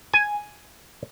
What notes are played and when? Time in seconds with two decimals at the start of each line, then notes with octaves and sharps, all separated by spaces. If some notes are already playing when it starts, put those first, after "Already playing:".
0.13 G#5